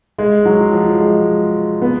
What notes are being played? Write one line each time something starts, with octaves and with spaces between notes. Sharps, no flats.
G#3
F#3
F3
G#3
B3